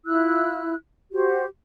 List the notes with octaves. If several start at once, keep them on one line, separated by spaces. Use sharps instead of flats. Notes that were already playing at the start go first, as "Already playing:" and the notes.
E4 F4 E6 F#6
F#4 G4 C5